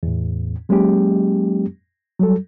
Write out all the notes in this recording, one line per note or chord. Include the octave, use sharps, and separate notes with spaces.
E2 A2
F#3 G#3 A#3 C#4 G4
F#3 G3 A4